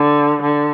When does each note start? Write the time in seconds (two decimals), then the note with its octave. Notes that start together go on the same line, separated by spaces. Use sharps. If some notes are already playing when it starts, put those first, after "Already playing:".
Already playing: D3
0.42 D3